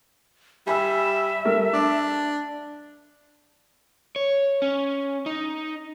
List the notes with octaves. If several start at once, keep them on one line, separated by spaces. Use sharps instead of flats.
G3 E5 G#5 B5 E6
G3 A3 A#4
D4 D6
C#5
C#4
D#4